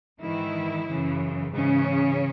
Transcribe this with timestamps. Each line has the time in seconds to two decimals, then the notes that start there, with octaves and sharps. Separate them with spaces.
0.21 G#2 D#3 E3 E4
0.88 F#2 C#3 E3
1.54 G#2 C#3 E3 C#4